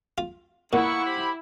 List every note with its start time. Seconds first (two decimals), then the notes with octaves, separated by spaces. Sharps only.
0.18 F4
0.73 A#2 A#3 B3 E4 F#5 C#6
1.05 G4 C5 B5